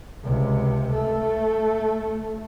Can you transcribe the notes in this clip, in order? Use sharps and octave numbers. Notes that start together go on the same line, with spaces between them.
C#2 C3
A3